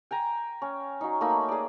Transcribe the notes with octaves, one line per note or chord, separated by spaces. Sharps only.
G5 G#5 A#5
C#4
F#3 D#4
A3 A#3 D#4 B5
G#4 D5